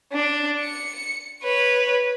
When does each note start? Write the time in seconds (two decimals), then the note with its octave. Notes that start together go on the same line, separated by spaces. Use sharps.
0.13 D4
0.61 C#7
1.43 B4 C#5